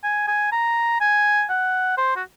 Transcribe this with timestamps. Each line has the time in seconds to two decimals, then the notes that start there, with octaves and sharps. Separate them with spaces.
0.04 G#5
0.28 G#5
0.52 A#5
1.01 G#5
1.50 F#5
1.98 C5
2.16 F#4